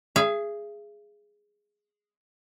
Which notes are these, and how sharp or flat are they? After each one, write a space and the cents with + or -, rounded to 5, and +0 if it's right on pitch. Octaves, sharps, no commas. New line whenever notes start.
G#4 +0 E5 +45